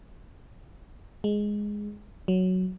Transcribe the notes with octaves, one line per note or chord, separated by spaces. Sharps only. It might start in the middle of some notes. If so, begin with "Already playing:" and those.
G#3
F#3